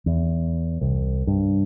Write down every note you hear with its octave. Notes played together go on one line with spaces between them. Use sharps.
E2
C2
G2